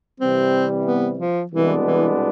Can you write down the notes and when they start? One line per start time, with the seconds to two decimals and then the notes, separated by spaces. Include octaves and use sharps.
0.20 C3 E3 G3 C4
0.86 B3
1.19 F3
1.52 C2 B2 E3 G#3 B3 D4
1.85 E3